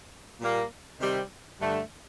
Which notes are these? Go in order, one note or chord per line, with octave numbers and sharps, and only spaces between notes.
A#2 G3 A#3
C3 D#3 G3 C4 G4
G2 D3 A3